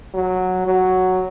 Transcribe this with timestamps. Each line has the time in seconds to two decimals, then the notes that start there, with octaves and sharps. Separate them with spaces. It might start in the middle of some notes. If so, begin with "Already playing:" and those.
0.14 F#3
0.66 F#3